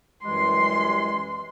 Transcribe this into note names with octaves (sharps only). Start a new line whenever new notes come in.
F#2 E3 G3 G#3 C6